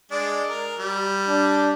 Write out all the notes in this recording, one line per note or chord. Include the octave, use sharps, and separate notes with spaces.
G#3 D4
A#4
G3
D4